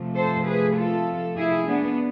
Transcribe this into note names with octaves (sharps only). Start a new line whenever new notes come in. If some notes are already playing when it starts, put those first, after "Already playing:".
Already playing: C3 F3 A3
A4 C5
G#4 B4
F4 A4
E4 G#4
B3 D4